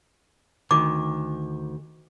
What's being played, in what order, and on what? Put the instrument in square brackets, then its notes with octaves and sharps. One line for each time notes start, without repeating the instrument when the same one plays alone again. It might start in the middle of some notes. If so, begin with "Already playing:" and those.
[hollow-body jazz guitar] D2 D#3 [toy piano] D6